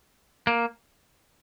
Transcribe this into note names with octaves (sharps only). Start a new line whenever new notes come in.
A#3